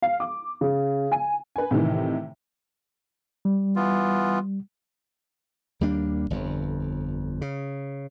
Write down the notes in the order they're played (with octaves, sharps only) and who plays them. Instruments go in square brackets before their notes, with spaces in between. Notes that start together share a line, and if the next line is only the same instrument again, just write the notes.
[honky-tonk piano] F5
D6
C#3
G#5
B4 G#5
A2 C3 D#3 E3
[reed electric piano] G3
[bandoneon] E3 B3 F4
[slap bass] D#2 G3 A#3 D4
G1 F2
C#3